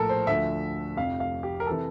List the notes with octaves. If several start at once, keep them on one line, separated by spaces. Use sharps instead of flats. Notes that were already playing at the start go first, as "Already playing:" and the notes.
Already playing: A#1 A2 F3 A4 A#4
C5
D2 D3 F3 E5
F1 F2 C3 F5
F5
G4
A#4
C3 E3 A4